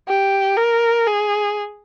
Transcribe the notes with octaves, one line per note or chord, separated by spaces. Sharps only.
G4
A#4
G#4